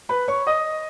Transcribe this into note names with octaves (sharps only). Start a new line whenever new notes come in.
B4 B5
C#5 C#6
D#5 D#6